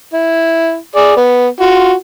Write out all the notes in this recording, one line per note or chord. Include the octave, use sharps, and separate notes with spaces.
E4
G#4 D5
B3
F4 F#4